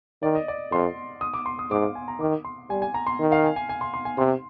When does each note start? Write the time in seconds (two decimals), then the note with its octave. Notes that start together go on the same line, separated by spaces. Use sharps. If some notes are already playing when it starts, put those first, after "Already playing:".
0.23 D#3 D5
0.35 D#5
0.48 D5
0.72 F2 C6
1.21 D#6
1.34 D6
1.46 C6
1.59 D#6
1.71 G#2 D6
1.83 F5
1.95 G#5
2.08 A#5
2.20 D#3 D6
2.45 C6
2.70 G3 G#5
2.82 G#5
2.94 A#5
3.07 C6
3.20 D#3
3.32 F5
3.44 G#5
3.56 G#5
3.69 G#5
3.81 C6
3.94 C6
4.05 G#5
4.18 C3 C6